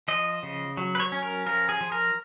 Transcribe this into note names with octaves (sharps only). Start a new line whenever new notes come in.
F3 D#5
C#3
F#3
B4
C#5
C#4
A#4
F3 A#4
G#4
F3
A#4